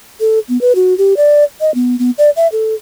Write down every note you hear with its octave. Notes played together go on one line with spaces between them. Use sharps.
A4
B3
B4
F#4
G4
D5
D#5
B3
B3
D5
E5
A4